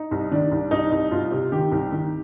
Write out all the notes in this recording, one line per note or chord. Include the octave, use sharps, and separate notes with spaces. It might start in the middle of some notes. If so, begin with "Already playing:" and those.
Already playing: D#4
C2
D#3 D4
C2
C2 D#4
C2
C2 F4
C3
D#3 G4
C2
D#3